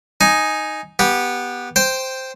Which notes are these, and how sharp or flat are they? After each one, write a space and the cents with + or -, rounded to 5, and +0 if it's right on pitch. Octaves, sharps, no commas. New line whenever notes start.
D#4 +0 G#5 +0
B3 -15 G4 +0
C5 +0 G5 +0